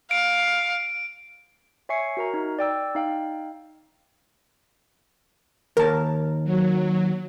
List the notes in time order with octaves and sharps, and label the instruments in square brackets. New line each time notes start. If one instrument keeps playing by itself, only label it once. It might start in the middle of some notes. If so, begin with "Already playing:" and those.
[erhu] F5 [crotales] D7
[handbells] C#5 E5 G#5 C#6 C7 C#7
F#4 A#4 A#5
D#4
D5 G5 E6
D#4 F5 G5
[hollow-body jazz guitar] D#2 A5 [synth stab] A#4
[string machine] F#3